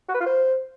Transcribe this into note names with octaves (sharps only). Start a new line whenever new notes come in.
F#4
B4
F4
C5